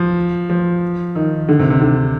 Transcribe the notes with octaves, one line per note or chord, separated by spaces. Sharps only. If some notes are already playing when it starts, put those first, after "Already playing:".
Already playing: F3
F3
D#3
D3
C3
C3
D3